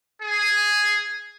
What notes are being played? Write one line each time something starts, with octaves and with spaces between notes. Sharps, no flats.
G#4